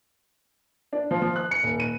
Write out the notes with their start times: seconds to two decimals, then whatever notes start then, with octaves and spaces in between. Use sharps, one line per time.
0.93 D4
1.11 F3
1.22 F3
1.36 F#6
1.51 C#7
1.63 D#1
1.80 D#7